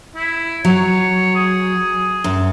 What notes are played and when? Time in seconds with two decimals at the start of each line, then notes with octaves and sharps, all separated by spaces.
0.15 E4
0.65 F#3 C#5
1.35 G#4
2.24 F#2